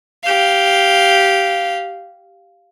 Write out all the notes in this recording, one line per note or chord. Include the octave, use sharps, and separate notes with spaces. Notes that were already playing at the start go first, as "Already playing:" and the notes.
G4 F5